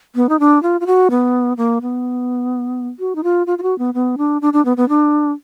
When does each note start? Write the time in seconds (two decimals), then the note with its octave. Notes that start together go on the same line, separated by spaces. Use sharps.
0.15 B3
0.29 D#4
0.40 D4
0.63 F4
0.81 F4
0.87 F#4
1.11 B3
1.57 A#3
1.82 B3
2.99 F#4
3.16 D#4
3.23 F4
3.47 F4
3.58 F4
3.63 F#4
3.79 B3
3.94 B3
4.18 D4
4.42 D4
4.53 D4
4.65 B3
4.77 B3
4.89 D4